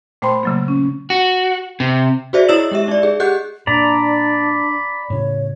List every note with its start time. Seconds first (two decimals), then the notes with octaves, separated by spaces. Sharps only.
0.22 A#2 A3 C5 G5 B5 C6
0.43 C#3 F#3 A#3
0.68 C#4
1.10 F#4
1.80 C3
2.33 F#4 G#4 C5 D5 E5
2.48 E4 C#5 D#5 E6 E7 F#7
2.71 G#3 G4 E5
2.88 D#4 D5
3.03 G#4
3.20 G4 G#4 D#5 F#5 F#6 G6
3.67 A#2 D4 D5 A#5 B5
5.10 A2 C#3 C#5